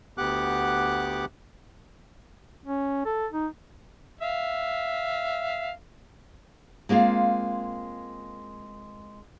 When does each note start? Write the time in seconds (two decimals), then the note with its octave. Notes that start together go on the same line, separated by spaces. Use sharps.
0.18 D2 B3 G4 F#5 D6 F#6
2.64 C#4
3.05 A4
3.32 D#4
4.21 E5 F5
6.89 G#3 A#3 C4 F4